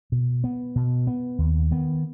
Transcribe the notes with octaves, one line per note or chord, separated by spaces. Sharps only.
B2
B3
B2
B3
D#2
D#3 B3